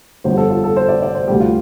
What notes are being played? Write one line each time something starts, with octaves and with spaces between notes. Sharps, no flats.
G1 F2 D3 G3 C5
A4
F4
A4
C5
D5
D5
C5
D2 D3 G3 G4
F4